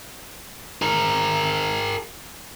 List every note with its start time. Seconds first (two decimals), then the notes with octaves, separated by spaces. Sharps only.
0.82 G#4 A#4